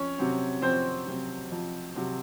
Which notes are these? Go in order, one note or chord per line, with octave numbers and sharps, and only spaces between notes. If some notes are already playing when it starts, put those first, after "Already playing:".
Already playing: F2 C#4 C#5
C3 F#3 C4
F2 C4 C5
C3 F#3 C4
F2
C3 F#3 C4